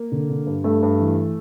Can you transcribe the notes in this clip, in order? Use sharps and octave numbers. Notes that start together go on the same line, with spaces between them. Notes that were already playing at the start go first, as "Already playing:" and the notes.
Already playing: A#3
D3
D3
G2
G2 A3
G2
E3